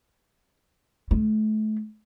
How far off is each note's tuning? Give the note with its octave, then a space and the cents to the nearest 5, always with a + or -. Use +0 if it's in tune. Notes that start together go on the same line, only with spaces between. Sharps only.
A3 -35